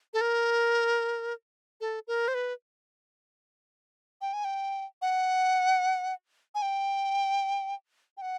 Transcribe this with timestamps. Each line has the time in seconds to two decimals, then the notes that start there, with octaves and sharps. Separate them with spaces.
0.14 A4
0.21 A#4
1.81 A4
2.08 A#4
2.28 C5
2.34 B4
4.21 G5
4.33 G#5
4.45 G5
5.02 F#5
6.55 G#5
6.62 G5
8.17 G5
8.22 F#5